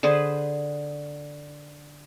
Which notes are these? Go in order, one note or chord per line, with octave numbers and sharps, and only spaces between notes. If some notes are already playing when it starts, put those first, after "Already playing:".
D3 G#4 B4 C5